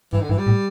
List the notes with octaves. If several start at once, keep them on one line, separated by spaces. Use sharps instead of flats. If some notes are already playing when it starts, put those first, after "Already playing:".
G2 E3
D3
G2 E3
G3
A2